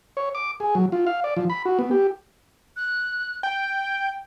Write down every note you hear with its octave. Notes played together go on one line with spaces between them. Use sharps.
C#5
D6
G#4
F#3
F4
F5
D5
F3
B5
F#4
B3
G4
F#6
G5 G6